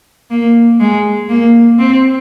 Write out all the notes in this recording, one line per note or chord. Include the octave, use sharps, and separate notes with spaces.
A#3
G#3
A#3
C4